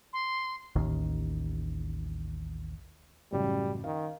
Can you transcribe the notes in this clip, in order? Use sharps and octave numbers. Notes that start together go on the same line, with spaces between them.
C6
A1 D#2 D#3
A1 F#2 C#3 G3
D#3 F5